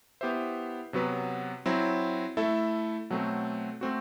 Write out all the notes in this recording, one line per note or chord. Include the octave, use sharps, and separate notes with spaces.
B3 E4 G4 C5 E5
C3 F#3 B3 F#4 B4
F#3 C4 E4
A3 E4 A4 E5
B2 F#3 A3 C4
A3 C4 F#4